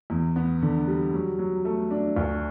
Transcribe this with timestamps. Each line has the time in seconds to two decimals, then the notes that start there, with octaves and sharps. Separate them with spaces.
0.10 E2
0.36 B3
0.62 D3
0.88 G3
1.13 F#3
1.39 F#3
1.65 A3
1.91 D4
2.16 D2